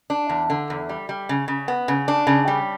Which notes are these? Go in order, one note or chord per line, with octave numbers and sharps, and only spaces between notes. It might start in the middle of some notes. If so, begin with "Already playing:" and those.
D4
E2
D3
E2
G3
G3
C#3
C#3
B3
C#3
D4
C#3
G3